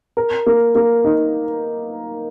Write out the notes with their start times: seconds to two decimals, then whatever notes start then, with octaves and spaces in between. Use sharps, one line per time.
0.17 A#4
0.46 A#3
0.75 A#3
1.04 D#4